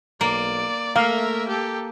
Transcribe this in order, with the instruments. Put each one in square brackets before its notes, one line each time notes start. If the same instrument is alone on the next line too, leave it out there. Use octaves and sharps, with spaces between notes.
[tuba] B1 [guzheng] A#3 [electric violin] D5
[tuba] A3 [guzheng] A#3 [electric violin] A#4 E5 [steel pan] F5
[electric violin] G4 A4